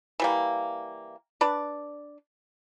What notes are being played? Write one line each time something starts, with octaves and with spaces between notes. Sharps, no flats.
E3 G3 A#3
D4 B4 D5